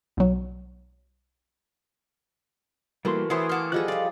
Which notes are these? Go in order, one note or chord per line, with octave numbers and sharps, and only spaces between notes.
B1 F#3
E3 G3 A3 A#3 F#4 A#4 C6
E3 B3 E4 G#4 C5 C6 D#6
A#3 F#4 G5 A5 D6 F6
F3 G3 G#4 A4 D#5 F#6
F3 F4 D5